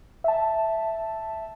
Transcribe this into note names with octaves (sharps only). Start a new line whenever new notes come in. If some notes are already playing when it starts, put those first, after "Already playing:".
E5 A5